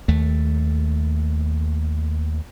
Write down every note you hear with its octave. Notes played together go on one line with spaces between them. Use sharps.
D#2 A3